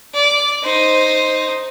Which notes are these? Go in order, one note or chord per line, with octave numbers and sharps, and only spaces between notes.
D5
D#4 C5